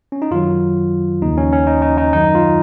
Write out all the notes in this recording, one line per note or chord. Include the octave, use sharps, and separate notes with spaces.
C#4
D#4
F#2 D#3 F#3 F4
D#2 C#3 F3 D#4
C#4
C#4
D#4
D#4
D#4
F#2 D#3 F#3 D#4
F4